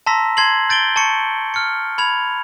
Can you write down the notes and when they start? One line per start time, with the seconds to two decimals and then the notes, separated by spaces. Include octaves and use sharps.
0.06 A5 A#5 C6 E6 A#6 B6
0.37 A5 C6 G#6 C7 F#7
0.69 G6 A6 D7 F#7 G7
0.96 A5 C#6 C#7
1.54 F6 C#7
1.98 B5 G#6 F7